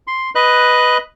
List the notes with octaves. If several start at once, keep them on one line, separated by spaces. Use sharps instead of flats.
C6
B4 D#5 F#6